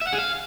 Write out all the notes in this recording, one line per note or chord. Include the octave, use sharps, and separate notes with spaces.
E5
F#5
G#4
F5